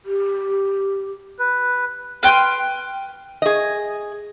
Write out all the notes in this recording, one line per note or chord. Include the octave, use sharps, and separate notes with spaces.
G4
B4
B4 G5 C6 F6
G#4 D#5